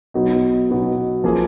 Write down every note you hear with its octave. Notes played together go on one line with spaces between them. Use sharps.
B2 F#3 B3 D#4
B2 F#3 B3 D#4
F3 A#3 F4 G#4